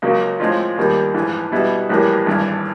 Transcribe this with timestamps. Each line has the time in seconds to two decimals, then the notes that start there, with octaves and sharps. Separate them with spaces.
0.02 C#2 C#3 F#3 A#3
0.40 A2 F3 G#3 C4 F4
0.77 D#2 D#3 G3 A#3
1.14 A#1 G#2 E3
1.52 B2 G3 B3 E4
1.89 A#1 A2 E3 G3 A#3
2.26 G#1 G2 E3